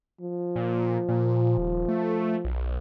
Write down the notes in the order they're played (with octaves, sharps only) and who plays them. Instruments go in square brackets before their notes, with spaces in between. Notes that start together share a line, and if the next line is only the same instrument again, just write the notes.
[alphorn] F3
[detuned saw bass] A#2
A#2
D#1
A3
B1